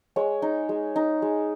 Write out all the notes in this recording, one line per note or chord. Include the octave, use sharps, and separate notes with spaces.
G#3 C#5
D#4
G#3
D#4
G#3